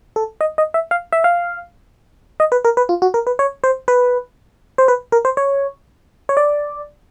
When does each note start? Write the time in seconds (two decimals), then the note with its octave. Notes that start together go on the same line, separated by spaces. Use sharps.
0.16 A4
0.41 D#5
0.58 D#5
0.74 E5
0.91 F5
1.13 E5
1.24 F5
2.40 D#5
2.52 B4
2.65 A#4
2.77 B4
2.89 F4
3.02 F#4
3.14 A#4
3.27 B4
3.39 C#5
3.64 C5
3.88 B4
4.78 C5
4.88 B4
5.12 A#4
5.25 C5
5.37 C#5
6.29 C#5
6.37 D5